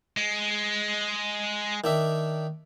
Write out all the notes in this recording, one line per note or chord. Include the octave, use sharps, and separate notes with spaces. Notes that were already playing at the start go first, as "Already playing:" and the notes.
G#3
D#3 D4 E5